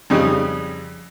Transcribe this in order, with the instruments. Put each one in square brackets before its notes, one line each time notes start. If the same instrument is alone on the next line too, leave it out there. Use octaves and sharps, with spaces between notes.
[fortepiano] F2 C#3 G3 D#4